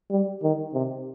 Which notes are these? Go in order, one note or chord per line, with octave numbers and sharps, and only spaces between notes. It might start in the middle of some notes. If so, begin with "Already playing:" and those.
G3
D#3
C3